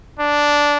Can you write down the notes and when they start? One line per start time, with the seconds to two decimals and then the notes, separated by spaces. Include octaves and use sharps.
0.19 D4